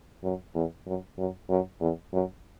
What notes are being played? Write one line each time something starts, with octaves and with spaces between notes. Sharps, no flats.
F#2
E2
F#2
F#2
F#2
E2
F#2